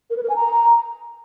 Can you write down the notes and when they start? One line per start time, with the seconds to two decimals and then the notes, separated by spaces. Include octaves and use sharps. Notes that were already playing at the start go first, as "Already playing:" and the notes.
0.10 A#4
0.17 B4
0.23 A#4
0.29 G#5
0.36 A#5